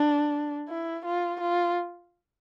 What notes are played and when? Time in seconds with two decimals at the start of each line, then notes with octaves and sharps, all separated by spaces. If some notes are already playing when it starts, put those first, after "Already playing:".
Already playing: D4
0.69 E4
1.05 F4
1.40 F4